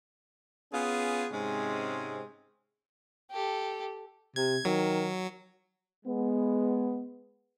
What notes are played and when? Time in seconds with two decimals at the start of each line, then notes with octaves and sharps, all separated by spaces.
0.73 B3 C#4 F4 G#4
1.32 G#2 C3 G#3 C4 C#4
3.31 G4 A4
4.36 C3 G#6
4.65 D#3 F#3
6.06 G#3 B3